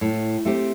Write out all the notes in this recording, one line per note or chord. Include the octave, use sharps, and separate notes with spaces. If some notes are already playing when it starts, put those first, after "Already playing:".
A2
A3 C4 G4